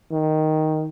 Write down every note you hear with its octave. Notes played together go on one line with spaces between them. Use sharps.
D#3